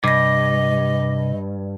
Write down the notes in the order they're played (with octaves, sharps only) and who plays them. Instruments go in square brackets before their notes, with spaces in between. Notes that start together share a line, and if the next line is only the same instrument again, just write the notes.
[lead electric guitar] G2 [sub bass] C3 [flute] D#5 [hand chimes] D6 A#6